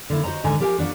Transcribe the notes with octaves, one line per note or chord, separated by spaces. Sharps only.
D3 A#3 E4
F#4 C5 D#5 A#5
D#2 G#2 D3 G#5 A#5
F3 G4 A#4 C5 F5 G#5
F3 A#3 D4 F#4